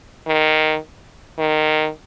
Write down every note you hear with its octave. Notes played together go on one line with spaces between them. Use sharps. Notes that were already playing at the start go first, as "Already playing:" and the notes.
D#3
D#3